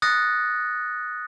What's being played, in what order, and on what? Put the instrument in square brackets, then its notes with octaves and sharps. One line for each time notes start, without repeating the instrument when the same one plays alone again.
[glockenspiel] D#6 F#6 A6 A#6 C#7